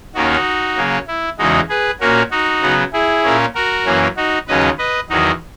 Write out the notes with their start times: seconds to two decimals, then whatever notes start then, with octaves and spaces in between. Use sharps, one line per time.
0.14 D#2 D#3 A#3 C#4 D#4 F#4
0.77 C#3 F#3 A#3 C#4
1.08 E4
1.39 E2 C#3 E3 G#3 D#4 F#4
1.69 G#4 B4
2.00 A#2 A#3 C#4 F#4 A#4
2.31 D#4 F#4
2.62 C#3 F#3 B3
2.93 E4 G#4
3.24 A#2 A#3 C#4
3.55 F#4 A#4
3.85 F#2 E3 A#3 C#4
4.16 D#4 F#4
4.48 D#2 C#3 F#3 C#4 B4 D#5
4.78 B4 D#5
5.10 E2 D#3 F#3 D#4 F#4